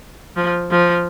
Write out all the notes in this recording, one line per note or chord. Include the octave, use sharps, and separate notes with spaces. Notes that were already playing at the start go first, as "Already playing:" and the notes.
F3
F3